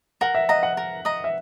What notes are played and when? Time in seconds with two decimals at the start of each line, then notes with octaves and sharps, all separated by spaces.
0.21 A#4 F#5
0.35 E5
0.49 D#5 F#5 A#5
0.63 F#5
0.77 A#4
1.05 D#5 A#5
1.24 E5